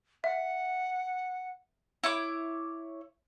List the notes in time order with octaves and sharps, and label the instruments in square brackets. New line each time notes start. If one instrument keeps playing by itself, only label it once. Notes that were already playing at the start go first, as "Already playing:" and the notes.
[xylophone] E5 [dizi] F#5
[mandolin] E4 C#5 D6